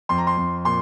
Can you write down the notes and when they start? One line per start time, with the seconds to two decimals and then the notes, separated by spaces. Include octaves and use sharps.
0.09 F2 C6
0.18 A#5
0.27 C6
0.37 F2
0.65 A#2 C6